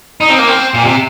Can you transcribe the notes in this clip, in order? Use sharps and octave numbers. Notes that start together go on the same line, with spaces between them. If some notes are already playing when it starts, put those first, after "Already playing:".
D#4
C4
A#3
C4
A#2
C3